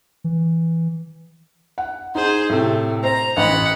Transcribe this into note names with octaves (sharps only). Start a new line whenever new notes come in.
E3
F#5
D#4 G#4 C5
A2 C3 A3
C5 A#5
A1 D#5 F#5 B5